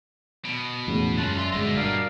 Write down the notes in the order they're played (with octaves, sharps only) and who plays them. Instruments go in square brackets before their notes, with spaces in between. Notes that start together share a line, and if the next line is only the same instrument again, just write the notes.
[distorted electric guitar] B2
[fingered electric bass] E2 A2 C#3
[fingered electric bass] F#2 [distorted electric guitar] G#3 F4 [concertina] A5 F#6
[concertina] D5 E5 [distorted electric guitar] F5 C6
[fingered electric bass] G1 G#3 [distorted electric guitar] F#4 D#5
[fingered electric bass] G2 [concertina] A#4 D5 F5